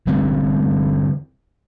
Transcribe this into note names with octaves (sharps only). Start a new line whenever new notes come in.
D3 E3 G3 C4